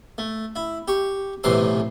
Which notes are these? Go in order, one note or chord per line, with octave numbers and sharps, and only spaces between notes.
A3
E4
G4 C#6
B1 A2 C3 E3 C6 D6